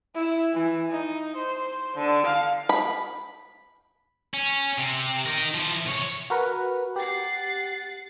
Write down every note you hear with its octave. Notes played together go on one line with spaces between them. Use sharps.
E4
E3
D#4
C5
D3
F5
B5
C#4
C3
D#4 A#4
F3 E4
C3 C#5
F#4 A#4 B4
G4 F#5 A6 C7